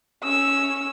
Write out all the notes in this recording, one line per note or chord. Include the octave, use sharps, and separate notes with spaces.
C#4 E6